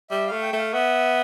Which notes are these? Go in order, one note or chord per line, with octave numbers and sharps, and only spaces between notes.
G3 E5
A3 F5
G5
A3
F5
B3 E5